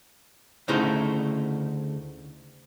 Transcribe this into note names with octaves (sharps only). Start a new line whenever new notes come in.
D2 C#3 A3 D#4 E4 C5